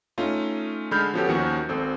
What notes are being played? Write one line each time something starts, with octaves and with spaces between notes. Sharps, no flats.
A3 C#4 D#4 F4
D3 G#3 B5 F6 G6
F3 B3 C#4 F#4 G4 A4
D#2 D#3 F3 C#4 F#4 C#7
G#1 C4 A4